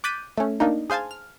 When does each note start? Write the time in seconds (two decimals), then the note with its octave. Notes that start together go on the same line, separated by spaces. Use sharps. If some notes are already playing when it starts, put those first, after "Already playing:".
0.04 D6 F#6 G6 A6 B6 D#7
0.38 A3 C#4
0.60 A#3 D4 D#4
0.90 G#4 C5 F5 G#5 A5
1.11 F6